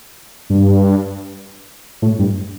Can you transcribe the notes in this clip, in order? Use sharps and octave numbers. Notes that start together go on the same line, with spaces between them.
G2
A2
G2